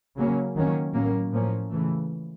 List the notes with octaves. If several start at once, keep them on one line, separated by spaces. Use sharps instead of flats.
C#3 F#3 A#3 C#4
D#3 F#3 A#3 C#4
A2 F#3 A#3 C#4
A2 F3 A#3 C#4
C#3 E3 A3